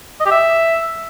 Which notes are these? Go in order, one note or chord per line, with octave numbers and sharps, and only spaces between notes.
D#5
G4
E5